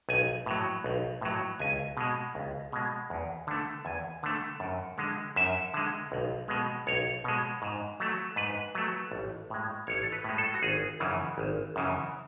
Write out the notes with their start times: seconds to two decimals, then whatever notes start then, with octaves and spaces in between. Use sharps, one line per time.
0.09 B1 G#5
0.46 A2 F#3
0.84 B1
1.21 A2 F#3
1.60 C#2 G#5
1.97 B2 G#3
2.35 C#2
2.72 B2 G#3
3.10 E2
3.47 D3 A3
3.85 E2 G#5
4.23 D3 A3
4.60 F#2
4.98 D3 G#3
5.36 F#2 E5
5.74 D3 G#3
6.12 B1
6.48 B2 G#3
6.87 B1 C#5
7.24 B2 G#3
7.62 G#2
8.00 F#3 A3
8.36 G#2 B4
8.75 F#3 A3
9.12 A1
9.50 A2 G#3
9.87 A1 C#5
10.03 A4
10.12 B4
10.24 A2 G#3
10.38 A4
10.54 F#4
10.62 G#1 G#4
11.00 F#2 C#3 E3
11.38 G#1
11.76 F#2 C#3 E3